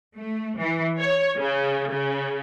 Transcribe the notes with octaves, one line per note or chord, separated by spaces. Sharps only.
A3
E3
C#5
C#3
C#3